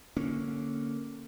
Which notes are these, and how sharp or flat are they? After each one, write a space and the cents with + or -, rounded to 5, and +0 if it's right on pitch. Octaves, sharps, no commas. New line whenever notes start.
D3 +0 A#3 +0 C#4 +0